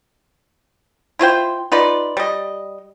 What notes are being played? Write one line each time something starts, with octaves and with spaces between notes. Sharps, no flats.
E4 F4 C5 G5
D#4 F4 B4 D5
G3 D#5